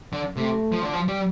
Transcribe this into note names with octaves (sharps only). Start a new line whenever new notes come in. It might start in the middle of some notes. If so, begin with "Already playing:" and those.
D3
C3 A3
F3
D3
F3
G3